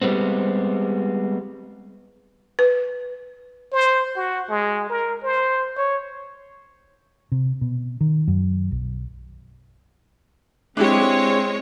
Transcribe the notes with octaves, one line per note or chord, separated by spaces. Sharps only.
G3 G#3 B3 C4
B4
C5
F#4
G#3
A#4
C5
C#5
C3
B2
D#3
F#2
B1
G#3 C4 D4 E4 G4 C#5